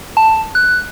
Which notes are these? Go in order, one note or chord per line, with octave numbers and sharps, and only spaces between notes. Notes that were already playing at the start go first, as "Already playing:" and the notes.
A5
F#6